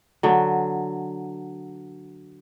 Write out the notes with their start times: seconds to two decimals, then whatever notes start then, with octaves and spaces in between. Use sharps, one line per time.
0.23 D3 F#3